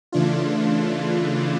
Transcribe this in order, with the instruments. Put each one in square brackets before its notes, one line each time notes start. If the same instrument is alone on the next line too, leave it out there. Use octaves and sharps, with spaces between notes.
[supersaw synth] C#3 E3 A3 D4 F4